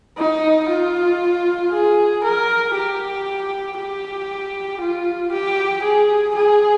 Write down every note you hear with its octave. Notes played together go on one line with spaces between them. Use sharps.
D#4
F4
G#4
A#4
G4
G4
F4
G4
G#4
G#4